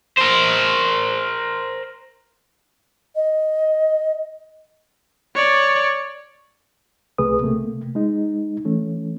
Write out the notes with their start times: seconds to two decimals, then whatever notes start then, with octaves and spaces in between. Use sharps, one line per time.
0.18 A#4 C5
3.15 D#5
5.36 C#5 D5
7.18 C2 C3 A3 G#4 B4 D#6
7.43 C3 A3 A#3
7.95 G#3 D#4
8.65 E3 A3 C#4